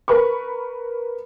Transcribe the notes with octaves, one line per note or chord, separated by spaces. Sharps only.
A#4 B4 B5 C#6